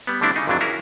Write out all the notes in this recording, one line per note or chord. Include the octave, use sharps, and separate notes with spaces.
G3 B3
D3 G3 A3 C4 D4 E4
C#3 D#4
G#1 F2 C3 E3 F#3 D4
C#4 E4 F#4 G#4 A#4